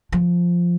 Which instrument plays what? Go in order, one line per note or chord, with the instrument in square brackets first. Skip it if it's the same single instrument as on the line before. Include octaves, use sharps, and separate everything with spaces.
[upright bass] F3